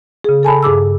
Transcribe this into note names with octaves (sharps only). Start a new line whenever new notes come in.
C#3 G#4
A4 G#5 A5 B5
G2 G#4 D6 E6